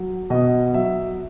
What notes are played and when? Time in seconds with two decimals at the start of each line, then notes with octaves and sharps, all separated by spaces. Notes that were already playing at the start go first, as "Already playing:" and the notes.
Already playing: F#3
0.30 B2 D#5
0.74 F#3 E5